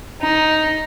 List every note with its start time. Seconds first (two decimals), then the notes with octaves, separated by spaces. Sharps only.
0.21 D#4